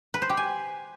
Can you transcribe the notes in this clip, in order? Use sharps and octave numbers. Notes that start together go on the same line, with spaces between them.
B4
C5
G4
G#5